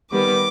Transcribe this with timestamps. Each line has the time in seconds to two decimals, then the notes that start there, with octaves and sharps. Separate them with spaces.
0.11 D#3 G3 B3 D6